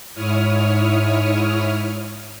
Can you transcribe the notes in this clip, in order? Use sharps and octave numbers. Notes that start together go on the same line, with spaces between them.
G#2 E4 C#5 D#6 F6